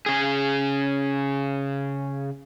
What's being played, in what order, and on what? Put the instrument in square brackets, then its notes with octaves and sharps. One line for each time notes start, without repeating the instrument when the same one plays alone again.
[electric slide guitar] C#3 G#4